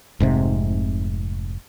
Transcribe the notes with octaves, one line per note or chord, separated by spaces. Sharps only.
F1 G#2 C3